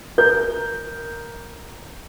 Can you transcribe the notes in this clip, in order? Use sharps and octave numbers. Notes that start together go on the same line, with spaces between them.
A#4 G6